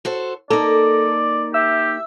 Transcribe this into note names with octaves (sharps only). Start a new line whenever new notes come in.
F#4 A4 C5
A#3 D#4 A4 D5
G4 E5 E6